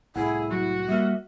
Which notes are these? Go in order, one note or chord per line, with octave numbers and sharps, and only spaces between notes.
C2 A2 E4 G#4 F#5
F#3 F#4
G3 A#3 E5